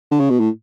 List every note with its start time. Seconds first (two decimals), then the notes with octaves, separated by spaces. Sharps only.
0.11 D3
0.20 C#3
0.30 B2
0.40 A2